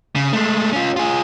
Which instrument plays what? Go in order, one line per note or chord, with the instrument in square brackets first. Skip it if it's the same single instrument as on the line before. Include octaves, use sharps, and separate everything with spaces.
[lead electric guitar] C#3
G#3 A3
C#4 F4
F4 G#4